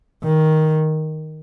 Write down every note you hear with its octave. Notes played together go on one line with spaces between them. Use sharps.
D#3